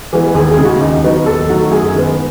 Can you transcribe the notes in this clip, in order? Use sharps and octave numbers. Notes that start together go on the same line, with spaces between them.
E3 G#3 B3
D#2 G#4
G#4
C#3 G#3
F#4
D#2 D#4
D#4
D#3 F#3 B3
D#2 A4
D#3 F#3 A3
F#2 G#4
D#3 G#3 B3